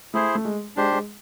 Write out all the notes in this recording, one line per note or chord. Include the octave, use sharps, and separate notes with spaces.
A3 E4 G#4 C5
A3
G#3
G#3 D4 G4 C5
G#3